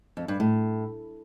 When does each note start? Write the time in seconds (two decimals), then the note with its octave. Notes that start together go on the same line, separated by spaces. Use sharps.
0.17 F2
0.28 G2
0.40 A2